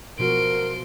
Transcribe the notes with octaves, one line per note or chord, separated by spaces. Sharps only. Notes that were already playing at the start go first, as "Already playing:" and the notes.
B2 F3 F#4 A#4 C6 D7